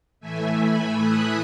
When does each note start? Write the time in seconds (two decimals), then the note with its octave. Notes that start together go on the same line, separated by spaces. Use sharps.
0.20 A2 E3 A3 E5 G#5
0.61 G#5 B5
1.01 D#6 F#6